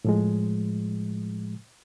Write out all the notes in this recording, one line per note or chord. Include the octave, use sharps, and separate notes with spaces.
A2 F3 G#3